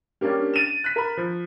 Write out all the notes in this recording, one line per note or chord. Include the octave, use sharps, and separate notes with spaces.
G3 A#3 C#4 D4 G4
A6 D#7 E7
F#6 B6
A#4 B5
F3